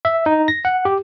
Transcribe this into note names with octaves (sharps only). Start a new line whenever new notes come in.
E5
D#4
A#6
F#5
G4